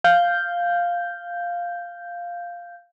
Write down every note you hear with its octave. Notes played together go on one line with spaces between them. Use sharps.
F5 G6